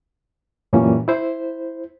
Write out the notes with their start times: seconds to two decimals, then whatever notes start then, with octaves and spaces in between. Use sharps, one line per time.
0.73 F#2 A#2 E3 G3 A#3 C#4
1.08 E4 C5